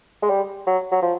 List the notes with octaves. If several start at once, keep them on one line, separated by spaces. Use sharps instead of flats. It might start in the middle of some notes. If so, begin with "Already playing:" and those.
G#3
G3
F#3
F#3
F3